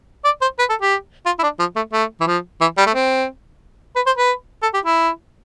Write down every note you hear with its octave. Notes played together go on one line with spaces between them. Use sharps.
D5
C5
B4
A4
G4
F4
E4
D4
F3
A3
A3
E3
F3
E3
G3
A3
C4
B4
C5
B4
A4
G4
E4